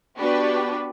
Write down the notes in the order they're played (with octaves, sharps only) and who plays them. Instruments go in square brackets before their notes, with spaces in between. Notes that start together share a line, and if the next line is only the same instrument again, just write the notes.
[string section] B3 D4 F#4 G4 B4